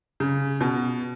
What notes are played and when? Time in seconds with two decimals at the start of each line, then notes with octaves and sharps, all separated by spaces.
0.20 C#3
0.61 B2